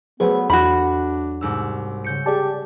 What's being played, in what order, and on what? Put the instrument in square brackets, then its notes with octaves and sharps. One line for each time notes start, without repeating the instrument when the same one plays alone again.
[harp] F#3 A3 [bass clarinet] B3 [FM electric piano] G#4 B4 C5
[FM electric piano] E2 [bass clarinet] D4 [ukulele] F#4 B5
[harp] C2 G#2 E6
C#3 G6 C#7
[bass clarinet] G4 [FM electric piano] G#4 D5 A5